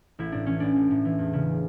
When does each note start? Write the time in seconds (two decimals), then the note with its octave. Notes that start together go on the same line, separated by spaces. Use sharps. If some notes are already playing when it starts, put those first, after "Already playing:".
0.19 A1 E4
0.32 A2 D4
0.46 E3 C#4
0.60 A1 D4
0.76 A1
0.91 A2
1.05 E3
1.18 E2
1.33 C#3